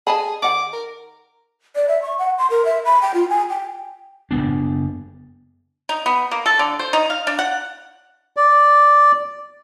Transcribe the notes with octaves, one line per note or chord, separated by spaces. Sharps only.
G#4 D#5 A5 B5
D#3 F#5 D6
A#4
D5
E5
C#6
F#5
C6
A#4
E5
B5
G5
F4
G#5
G5
F#1 G2 B3 D4
D#4
B3
A#3
A4
D3
C5
D#4
F5
D4
F#5
D5